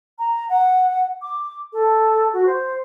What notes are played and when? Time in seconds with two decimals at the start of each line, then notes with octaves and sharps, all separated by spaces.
0.19 A#5
0.49 F#5
1.22 D6
1.73 A4
2.33 F#4
2.46 C5